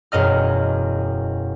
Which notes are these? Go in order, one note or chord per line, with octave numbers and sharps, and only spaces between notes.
E1 F#2 D#5 F6